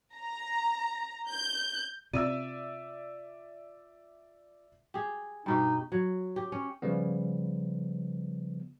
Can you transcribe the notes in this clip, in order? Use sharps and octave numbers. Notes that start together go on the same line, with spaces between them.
A#5
G6
C3 F4 D5 E5 E6 D#7
G4 G#4
G2 B2 D#4 G4
F#3
G4
C#4
C#3 F3 G3 B3